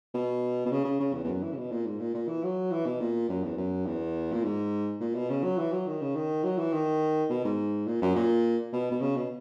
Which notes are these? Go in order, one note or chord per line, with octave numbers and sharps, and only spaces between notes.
B2
B2
C#3
C#3
C#3
E2
E2
F#2
E3
C#3
B2
A#2
G#2
A#2
A#2
E3
F#3
E3
B2
A#2
F#2
E2
F#2
E2
A#2
G#2
A#2
B2
C#3
F#3
E3
F#3
D#3
C#3
D#3
F#3
E3
D#3
B2
G#2
A#2
F#2
A#2
B2
B2
C#3
B2